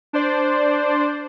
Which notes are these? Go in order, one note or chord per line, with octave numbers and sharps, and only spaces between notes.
D4 C5 D5